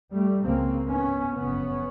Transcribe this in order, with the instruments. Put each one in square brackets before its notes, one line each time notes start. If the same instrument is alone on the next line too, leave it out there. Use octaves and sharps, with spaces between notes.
[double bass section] G3 A3
C#2 C#3 A#3 C4
B3 C#4
F#1 F2 C#3 B3 C#4